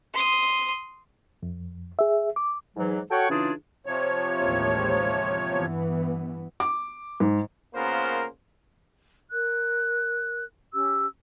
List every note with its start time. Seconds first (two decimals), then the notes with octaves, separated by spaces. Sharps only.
0.14 C6 D#6
1.43 F2
1.99 G#4 E5
2.36 D6
2.77 G#2 E3 F#3
3.11 F#4 A4 C#5 F#5 G5 C#6
3.30 C#3 E3 D4 D#4 F4 G#4
3.86 C3 F3 C#5
4.36 A1 D#2 G#3
5.53 G2 E3 B3
6.60 D6
7.20 G#2
7.74 C#3 A#3 B3 F4 A#4 C5
9.31 A#4 F#6
10.74 C#4 G4 E6